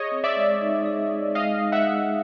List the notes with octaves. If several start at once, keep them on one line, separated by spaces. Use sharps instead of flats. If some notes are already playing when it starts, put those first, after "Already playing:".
Already playing: G#4 C#5 D#5
C4
D5 E5
G#3
D#4
G#4
C4
G#3 D#5 F5
D#4
E5 F#5
G#4